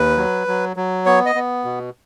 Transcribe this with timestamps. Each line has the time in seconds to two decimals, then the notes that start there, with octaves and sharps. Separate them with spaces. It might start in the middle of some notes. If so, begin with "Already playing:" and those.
Already playing: D#2 B4
0.17 F#3
0.47 F#3
0.76 F#3
1.06 B3 C#5
1.26 D#5
1.35 B3
1.65 B2